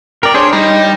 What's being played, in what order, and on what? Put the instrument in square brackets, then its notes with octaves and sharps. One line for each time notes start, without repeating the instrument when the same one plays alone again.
[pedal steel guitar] A#4 D5 [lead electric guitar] G5
[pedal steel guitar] D4 G#4 C5 [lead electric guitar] C#5
[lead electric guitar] G3 [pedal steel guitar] D#4